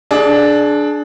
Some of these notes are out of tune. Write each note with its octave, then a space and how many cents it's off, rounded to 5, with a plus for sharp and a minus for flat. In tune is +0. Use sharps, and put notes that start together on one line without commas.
D4 +0 G#4 +30